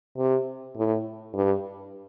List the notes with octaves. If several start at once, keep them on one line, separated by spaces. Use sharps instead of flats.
C3
A2
G2